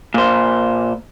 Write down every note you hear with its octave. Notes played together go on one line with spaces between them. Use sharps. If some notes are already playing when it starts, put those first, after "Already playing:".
A#2 C5